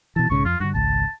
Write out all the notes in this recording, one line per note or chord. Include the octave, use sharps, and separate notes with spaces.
B2 E3 A5
B1 G#2 C#3 C#6
F2 F4
G2 D3 F#4
G#1 C#2 A5